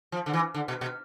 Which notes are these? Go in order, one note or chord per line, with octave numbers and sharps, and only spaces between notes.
F3
D3
E3
D3
B2
B2